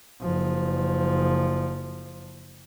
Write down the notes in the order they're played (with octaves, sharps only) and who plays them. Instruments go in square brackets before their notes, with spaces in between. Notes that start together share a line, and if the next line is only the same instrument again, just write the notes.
[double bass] F#1 F3